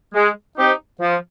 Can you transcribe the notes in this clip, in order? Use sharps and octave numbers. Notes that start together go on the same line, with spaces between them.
G#3
C4 D#4 G4
F3